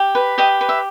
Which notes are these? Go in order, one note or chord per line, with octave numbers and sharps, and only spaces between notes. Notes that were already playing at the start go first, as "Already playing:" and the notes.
Already playing: G4
B4
G4 D#5
B4
E5